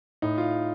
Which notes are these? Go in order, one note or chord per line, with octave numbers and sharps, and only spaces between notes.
A2 D#4
F4